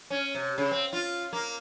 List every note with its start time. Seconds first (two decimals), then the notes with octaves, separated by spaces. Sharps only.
0.10 C#4
0.35 C3
0.58 C#3
0.71 C4
0.93 F4
1.33 A#3